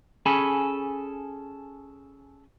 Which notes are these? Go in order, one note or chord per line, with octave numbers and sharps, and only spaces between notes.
C#4 G#4 A4 G#5 B5